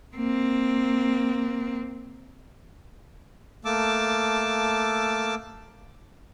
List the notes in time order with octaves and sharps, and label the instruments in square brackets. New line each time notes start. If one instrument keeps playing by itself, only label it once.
[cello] A#3 C4
[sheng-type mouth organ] A3 A#3 A5 D6 E6